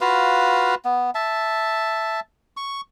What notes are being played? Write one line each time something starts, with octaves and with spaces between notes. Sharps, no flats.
F4 F#4 B4 F5
B3
E5 A5
C#6